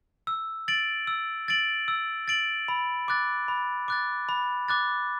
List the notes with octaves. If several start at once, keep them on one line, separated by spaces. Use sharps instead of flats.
E6
A6 D7 F#7
E6
A6 D7 F#7
E6
A6 D7 F#7
B5
D6 F#6 A6
B5
D6 F#6 A6
B5
D6 F#6 A6